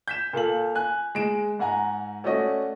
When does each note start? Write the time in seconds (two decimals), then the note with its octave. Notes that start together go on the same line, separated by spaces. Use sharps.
0.08 G6 B6 E7
0.33 A#2 A4 F5 F#7
0.75 G#5 F#6
1.15 G#3 D7 E7
1.59 G#2 F#5 G#5 A#5
2.24 A3 C#4 F#4 D5 D#5